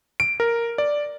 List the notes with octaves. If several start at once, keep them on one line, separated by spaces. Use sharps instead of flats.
D7
A#4
D5